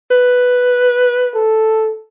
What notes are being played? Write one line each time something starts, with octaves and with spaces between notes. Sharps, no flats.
B4
A4